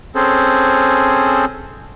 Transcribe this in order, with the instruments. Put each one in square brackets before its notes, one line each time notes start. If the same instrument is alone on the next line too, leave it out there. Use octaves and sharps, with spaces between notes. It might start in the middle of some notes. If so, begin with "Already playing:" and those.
[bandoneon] C4 C#4 G#4 A4 C5